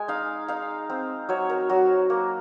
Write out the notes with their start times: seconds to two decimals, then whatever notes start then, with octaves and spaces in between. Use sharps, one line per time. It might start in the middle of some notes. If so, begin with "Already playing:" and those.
Already playing: G#3 G#5
0.08 D#4 F5
0.48 D#4 F5
0.90 C4
1.29 F#3 C#5
1.50 A#4
1.69 F#3 F#4
2.10 A#3